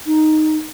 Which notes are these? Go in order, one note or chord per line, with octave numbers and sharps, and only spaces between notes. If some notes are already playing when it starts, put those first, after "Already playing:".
D#4